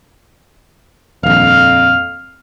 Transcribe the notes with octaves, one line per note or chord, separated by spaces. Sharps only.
D#1 A#1 F2 F5 F6